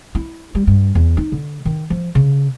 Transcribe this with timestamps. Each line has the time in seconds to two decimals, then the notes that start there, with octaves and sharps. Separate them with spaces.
0.15 E4
0.55 G3
0.67 G2
0.95 E2
1.17 D#4
1.32 D3
1.65 D#3
1.90 F3
2.15 C#3